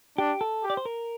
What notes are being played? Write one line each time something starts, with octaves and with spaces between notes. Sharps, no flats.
D4 G4
A4
G4
D5
C5
A#4